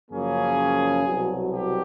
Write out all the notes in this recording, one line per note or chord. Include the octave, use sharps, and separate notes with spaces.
F#2 C#3 F3 A#3 C#4 G#4
C2 B2 F#3
G4